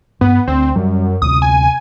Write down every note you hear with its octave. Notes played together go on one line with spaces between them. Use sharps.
G2 B3
D2 C4
F#2 G3
D2 C3 D#6
G#5